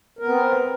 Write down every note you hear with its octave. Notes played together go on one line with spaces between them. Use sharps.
B3 C4 A#4